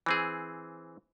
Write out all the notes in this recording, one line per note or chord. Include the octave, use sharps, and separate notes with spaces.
E3 C4 G#4